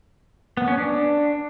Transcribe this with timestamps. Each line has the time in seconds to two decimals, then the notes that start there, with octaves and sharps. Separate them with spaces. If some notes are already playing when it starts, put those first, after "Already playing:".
0.57 B3
0.68 C#4
0.78 D4